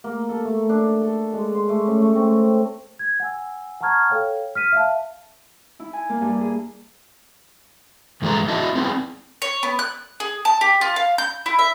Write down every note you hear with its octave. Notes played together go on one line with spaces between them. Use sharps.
A#3
A4
A3
D4
A4
G#3
C6
A3
C#4
A3
C4
G#6
F#5 G#5 E6
F#5 A5 A#5 C#6 F6 G#6
A4 C#5 F5 G5
F6 B6 D#7
E5 F5 A5
E4
G#5
A#3
G2
G#4
G2 E3 G#3 G#4 A4 A#5
E4 F#4 D#5 E5 A5
B3 C4 E4 G#4
C#5
B3
F#6
G#4
A5
G4
F4
F5
G6
E4
E5